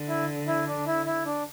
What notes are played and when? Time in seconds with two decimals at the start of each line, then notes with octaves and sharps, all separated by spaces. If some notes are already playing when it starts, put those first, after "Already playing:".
Already playing: D3
0.08 E4
0.47 E4
0.67 D4
0.86 E4
1.06 E4
1.25 D4